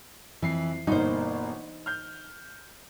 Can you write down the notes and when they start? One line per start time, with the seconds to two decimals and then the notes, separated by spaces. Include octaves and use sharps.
0.42 F2 E3 C7
0.87 G1 B2 A#3 D#4 C5
1.86 F6 G6